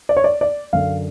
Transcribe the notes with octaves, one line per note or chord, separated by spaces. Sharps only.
D5
C#5
D5
D5
F#2 D3 F5